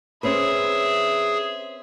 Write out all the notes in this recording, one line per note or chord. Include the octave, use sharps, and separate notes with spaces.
C4 C#4 G#4 B4 E5